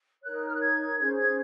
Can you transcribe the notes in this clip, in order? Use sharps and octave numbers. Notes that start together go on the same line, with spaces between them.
D#4 A#4 C#5 F#6
F6
F#6
G#6
C#4 G#4 C5 G#6
G#6